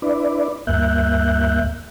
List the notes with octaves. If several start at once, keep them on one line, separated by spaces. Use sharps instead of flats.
D4 E4 B4 D5
D2 G2 A#3 E5 F#6 G6